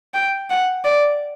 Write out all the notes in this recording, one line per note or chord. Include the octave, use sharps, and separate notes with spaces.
G5
F#5
D5